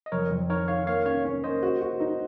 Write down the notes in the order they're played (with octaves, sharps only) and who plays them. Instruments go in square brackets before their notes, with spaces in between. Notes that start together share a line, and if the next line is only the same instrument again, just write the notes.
[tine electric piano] D#5
[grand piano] F2 [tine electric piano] A#4 C#5
[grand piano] F2
[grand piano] D#3 [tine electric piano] A#4 C#5
[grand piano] D#3 [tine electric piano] C#5 F5
[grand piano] A#3 [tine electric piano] C#5 F5
[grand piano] C#4 [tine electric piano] C#5 F5
[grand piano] C#4
[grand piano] A#3 [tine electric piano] C5 D#5
[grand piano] F#4
F#4
D#4